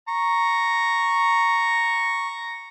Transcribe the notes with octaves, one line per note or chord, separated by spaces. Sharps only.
A#5 C#6